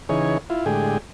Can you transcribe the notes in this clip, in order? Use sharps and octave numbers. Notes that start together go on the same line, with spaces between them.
C#3 E3 D#4 G#4 C#5
E4 F4
A2 D3 G#3 G4 G#4